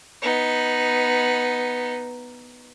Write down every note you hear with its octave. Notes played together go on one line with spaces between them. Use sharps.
B3 D#4